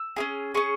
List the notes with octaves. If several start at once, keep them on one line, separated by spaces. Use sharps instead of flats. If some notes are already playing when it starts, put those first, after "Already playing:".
Already playing: E6
C#4 E4 G#4
C#4 G#4 C#6